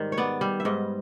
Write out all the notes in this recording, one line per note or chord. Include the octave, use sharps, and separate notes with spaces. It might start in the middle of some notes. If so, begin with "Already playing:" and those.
Already playing: G#2 D#3 G3
C#5
B3 D5
G3
E5
G#2 D#5